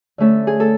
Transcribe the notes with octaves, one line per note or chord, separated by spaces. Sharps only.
D3 A3 C#4 A4
G#4
A4